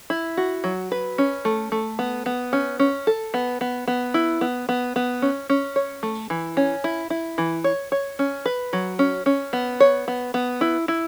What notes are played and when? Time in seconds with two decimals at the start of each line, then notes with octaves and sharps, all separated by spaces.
0.10 E4
0.37 F#4
0.64 F#3
0.92 B4
1.18 C#4
1.45 A3
1.72 A3
1.99 B3
2.26 B3
2.53 C#4
2.79 C#4
3.07 A4
3.34 B3
3.61 B3
3.88 B3
4.14 E4
4.41 B3
4.69 B3
4.96 B3
5.22 C#4
5.50 C#4
5.76 C#5
6.03 A3
6.30 E3
6.57 C#4
6.84 E4
7.10 E4
7.38 E3
7.64 C#5
7.92 C#5
8.19 C#4
8.46 B4
8.73 F#3
8.99 C#4
9.26 C#4
9.53 B3
9.80 C#5
10.08 B3
10.34 B3
10.61 E4
10.88 E4